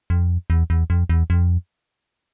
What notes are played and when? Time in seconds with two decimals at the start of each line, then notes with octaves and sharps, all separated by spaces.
0.10 F2
0.50 E2
0.70 E2
0.90 F2
1.09 E2
1.30 F2